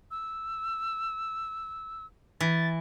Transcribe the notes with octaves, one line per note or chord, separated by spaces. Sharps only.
E6
E3 A6